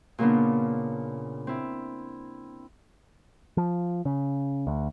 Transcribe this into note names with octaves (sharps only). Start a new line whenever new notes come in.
A#2 C#3 A#3 B3 D4
C4 E4
F3
C#3
D2